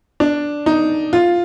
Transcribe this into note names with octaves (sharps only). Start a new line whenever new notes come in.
D4
D#4
F4